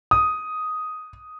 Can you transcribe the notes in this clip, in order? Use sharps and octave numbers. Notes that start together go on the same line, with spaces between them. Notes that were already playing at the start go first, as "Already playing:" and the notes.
D#6